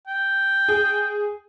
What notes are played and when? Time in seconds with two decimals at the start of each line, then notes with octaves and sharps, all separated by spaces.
0.07 G5
0.68 G#4